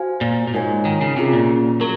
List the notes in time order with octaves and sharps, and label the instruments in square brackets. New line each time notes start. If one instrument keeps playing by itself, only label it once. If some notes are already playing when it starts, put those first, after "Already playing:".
Already playing: [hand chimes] F#4 C5 F5 G#5
[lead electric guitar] A#2
A#2
[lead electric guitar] G#2 [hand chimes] F4 A#4 C#5 G#5
[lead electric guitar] D#3
C#3
[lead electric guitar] C3 [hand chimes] C#4 F4 G#4
[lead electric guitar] A#2
[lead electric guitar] F#3 [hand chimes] A#4